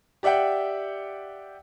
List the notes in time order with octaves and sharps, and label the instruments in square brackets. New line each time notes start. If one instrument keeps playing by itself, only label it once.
[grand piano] G4 D5 E5 F#5 G5